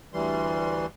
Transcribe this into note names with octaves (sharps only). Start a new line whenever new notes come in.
D2 E3 G3 C6